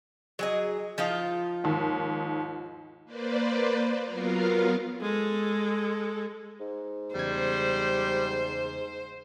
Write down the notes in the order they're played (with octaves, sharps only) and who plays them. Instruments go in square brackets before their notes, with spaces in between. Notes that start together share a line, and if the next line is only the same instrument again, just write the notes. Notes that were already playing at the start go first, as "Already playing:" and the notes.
[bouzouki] F#3 G#4 D#5
F3 D#4 F4
[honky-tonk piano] D#2 G#2
[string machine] A#3 B4 C5 D5
F#3 B3 F4 A#4 F5
[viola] G#3 A4
[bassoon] G#2
[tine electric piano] E2 C#3 G#6 [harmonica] G3 [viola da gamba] C5